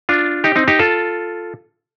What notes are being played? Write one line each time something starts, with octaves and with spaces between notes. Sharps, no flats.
D4 F4
D#4 G4
C4 D#4
D#4 G4
F4 A4